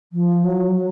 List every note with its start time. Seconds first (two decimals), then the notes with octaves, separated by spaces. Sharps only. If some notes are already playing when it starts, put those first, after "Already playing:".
0.13 F3
0.44 F#3